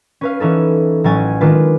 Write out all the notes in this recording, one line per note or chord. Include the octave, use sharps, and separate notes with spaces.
C#4 B4 F5
E3 C#4 D#4 A4
A1 F#3 C#4 G#5 A6
D#3 G#3 D4 F4 B4